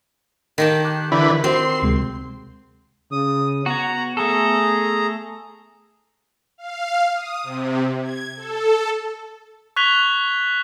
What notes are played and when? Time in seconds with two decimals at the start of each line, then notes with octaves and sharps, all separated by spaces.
0.58 D#3 G4 A5
0.84 D6 F#6
1.12 D3 E3 B4
1.44 C4 F#4 C5 C6
1.82 D2 C3 G#3
3.12 C#3 D#6
3.66 B3 F#4 C#5 A#5
4.17 A3 G#4 A4 A#5
6.58 F5
7.15 D#6
7.43 C3
8.01 G#6
8.37 A4
9.76 C#6 F#6 G#6 B6 F7 G7